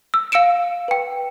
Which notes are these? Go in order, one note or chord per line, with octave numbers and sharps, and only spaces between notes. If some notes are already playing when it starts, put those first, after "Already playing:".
E6
F5 E6 C#7 D7 E7
B4 G5